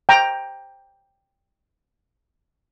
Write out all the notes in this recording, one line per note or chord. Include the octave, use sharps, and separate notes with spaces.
G5 A#5